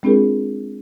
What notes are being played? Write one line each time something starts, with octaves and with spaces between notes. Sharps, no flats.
G#3 C4 D4 F4 G#4 A#4